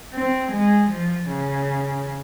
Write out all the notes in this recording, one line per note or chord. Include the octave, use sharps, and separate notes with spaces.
C4
G#3
F3
C#3